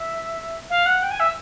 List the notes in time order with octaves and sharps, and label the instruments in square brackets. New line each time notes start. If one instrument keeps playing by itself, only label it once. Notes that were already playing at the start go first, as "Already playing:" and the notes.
Already playing: [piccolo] E5
F5
F#5
G5
G#5
E5